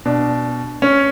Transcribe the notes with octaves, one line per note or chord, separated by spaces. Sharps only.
B2 D4
C#4